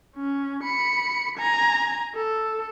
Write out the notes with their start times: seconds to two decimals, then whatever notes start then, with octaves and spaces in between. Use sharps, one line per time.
0.16 C#4
0.64 B5 C#7
1.38 G#5 A#5
2.15 A4